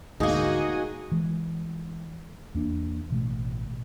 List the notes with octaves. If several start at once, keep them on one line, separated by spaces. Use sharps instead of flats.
D2 G#2 B2 A#3 D#4 F#4 G#4 D#5
E3 G#3
E2 A#3 D4
A1 B2 A3